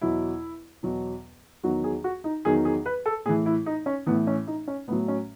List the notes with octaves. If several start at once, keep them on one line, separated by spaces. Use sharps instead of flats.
E2 B2 F#3 E4
E2 B2 F#3
E2 D#3 F#3 F#4
G#4
F#4
D#4
E2 D#3 F#3 G#4
G#4
B4
A4
A2 E3 G#4
E4
D#4
C#4
A2 E3 B3
C#4
D#4
C#4
A2 F#3 B3
C#4